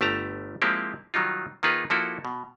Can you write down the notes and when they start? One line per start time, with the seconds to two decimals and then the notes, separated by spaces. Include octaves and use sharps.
0.01 G1 A3 G4 A5 A#5
0.62 F3 G#3 A#3 C4 E4 G4
1.14 D#3 F#3 G3 D#4 F4
1.63 D#3 A#3 D#4 F4 G#4 B4
1.90 F3 A#3 E4 F#4 A4
2.25 B2